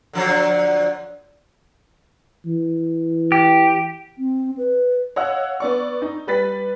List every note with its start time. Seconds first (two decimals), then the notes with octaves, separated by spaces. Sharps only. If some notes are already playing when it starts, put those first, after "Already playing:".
0.13 D3 F3 F#3
2.46 E3
3.32 G4
4.18 C4
4.57 B4
5.16 C#5 D#5 F5 F#5 E6
5.60 B3 D5 C#6
6.02 D#4
6.27 G3 B4 A6 B6